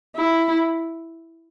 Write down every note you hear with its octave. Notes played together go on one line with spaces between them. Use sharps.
E4